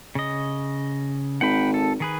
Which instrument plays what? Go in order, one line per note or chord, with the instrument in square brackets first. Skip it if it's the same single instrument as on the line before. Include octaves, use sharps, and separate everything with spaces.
[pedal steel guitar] C#3 D#5
[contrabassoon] G#1 [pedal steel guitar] F#5 G5 B5
[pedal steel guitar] A4
D#3 G#4 B4